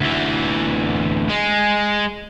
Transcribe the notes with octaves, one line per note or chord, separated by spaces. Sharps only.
D2 E3
G#3